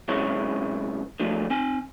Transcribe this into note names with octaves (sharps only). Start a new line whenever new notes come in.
F#2 C3 G#3 B3 E4 C#5
D3 F3 F#3 A3
C4 G#5